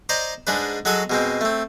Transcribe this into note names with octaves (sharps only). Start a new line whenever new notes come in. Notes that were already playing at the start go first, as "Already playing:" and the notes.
C5 D5 D#5 A#5
G#2 G#3 D4 B4
F#3 G#3 F#4 A4 D#6
B2 G#3 C4
A3 C4